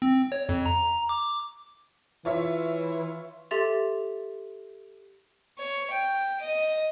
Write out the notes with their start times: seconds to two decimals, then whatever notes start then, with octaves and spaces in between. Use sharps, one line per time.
0.02 C4
0.32 C#5
0.49 F2
0.66 A#5
1.09 D6
2.25 E3 F4 C#5 E5
3.51 G4 A4 E5 C6 A6 F7
5.59 C#5
5.91 G5
6.40 D#5